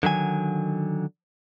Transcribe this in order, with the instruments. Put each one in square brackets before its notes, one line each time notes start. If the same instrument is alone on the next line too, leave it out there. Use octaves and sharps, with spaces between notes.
[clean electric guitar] D3 D#3 F#3 G#5